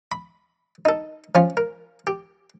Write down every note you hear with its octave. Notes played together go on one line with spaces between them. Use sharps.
B5
D#4 A4
F3 C#4 F4
A#4
G4